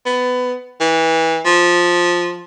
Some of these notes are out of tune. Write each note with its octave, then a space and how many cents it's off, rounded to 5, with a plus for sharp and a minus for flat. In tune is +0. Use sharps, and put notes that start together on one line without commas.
B3 +20
E3 -20
F3 +5